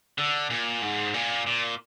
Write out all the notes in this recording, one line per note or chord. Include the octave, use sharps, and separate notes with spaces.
D3
A#2
G#2
A#2
A#2